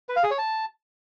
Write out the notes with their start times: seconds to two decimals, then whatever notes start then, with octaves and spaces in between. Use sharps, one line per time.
0.09 B4
0.16 F5
0.23 G#4
0.31 C#5
0.38 A5